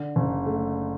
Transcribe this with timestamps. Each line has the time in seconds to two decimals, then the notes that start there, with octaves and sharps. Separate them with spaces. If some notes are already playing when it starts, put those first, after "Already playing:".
Already playing: D3
0.16 F#1
0.46 A3